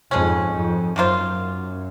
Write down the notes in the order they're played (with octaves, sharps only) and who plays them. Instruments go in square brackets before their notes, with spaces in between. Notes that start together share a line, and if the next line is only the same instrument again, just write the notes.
[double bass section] F2 G#2 [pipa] F3 G#3 C#4
[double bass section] F2
[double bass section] F#2 [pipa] D#3 A#3 F4 C5